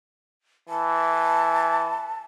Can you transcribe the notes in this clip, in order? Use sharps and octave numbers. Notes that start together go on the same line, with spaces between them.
E3 A5